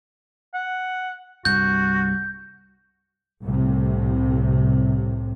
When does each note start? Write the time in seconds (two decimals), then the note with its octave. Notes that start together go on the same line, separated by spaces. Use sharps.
0.54 F#5
1.45 C2 G2 F#4 G6
3.44 C2 A2 C3